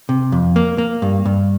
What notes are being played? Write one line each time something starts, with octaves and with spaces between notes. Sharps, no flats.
C3
F2
A#3
A#3
G2
G2